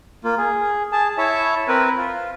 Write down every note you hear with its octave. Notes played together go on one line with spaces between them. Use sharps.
A#3 F4
G#4
G#4 A5
E4 C#5 E5 A5
C4 A#4 B4
F4